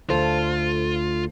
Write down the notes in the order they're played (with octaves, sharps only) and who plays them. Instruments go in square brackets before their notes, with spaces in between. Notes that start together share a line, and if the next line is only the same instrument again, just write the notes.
[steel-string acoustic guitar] D2 A4 C5 [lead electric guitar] F4